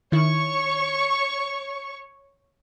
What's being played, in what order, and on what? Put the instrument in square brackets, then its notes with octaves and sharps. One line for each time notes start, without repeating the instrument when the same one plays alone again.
[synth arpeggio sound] D#3 E4 [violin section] C#5 C#6